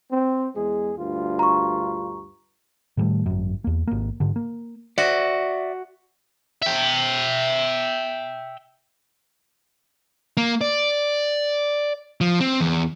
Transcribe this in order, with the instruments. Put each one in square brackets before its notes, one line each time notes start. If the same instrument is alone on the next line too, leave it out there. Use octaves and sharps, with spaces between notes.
[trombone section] C4
E2 G#3 G#4
D2 G2 F4
[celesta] A#5 C#6
[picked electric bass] A2 D#3 G3 A3
G#1 F#2
E2 A#3
G#1 A#3
G#2 D3
A#3
[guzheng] F#4 [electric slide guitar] D5 E5
[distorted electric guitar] E5 G5
A#3
D5
F3
C4
E2